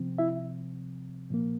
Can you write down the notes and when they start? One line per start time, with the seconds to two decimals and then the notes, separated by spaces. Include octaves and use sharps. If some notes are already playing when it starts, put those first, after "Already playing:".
Already playing: C3 F3 C4
0.18 E4 E5
1.30 A#2 F3 A#3